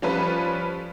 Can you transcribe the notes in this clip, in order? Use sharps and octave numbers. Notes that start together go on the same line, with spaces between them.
F3 G3 C#4 F4 A4 B4